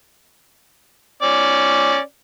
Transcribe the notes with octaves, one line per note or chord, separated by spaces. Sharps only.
C#4 D5